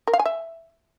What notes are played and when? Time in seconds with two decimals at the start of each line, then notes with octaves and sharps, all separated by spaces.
0.07 A#4
0.13 F5
0.19 G#5
0.26 E5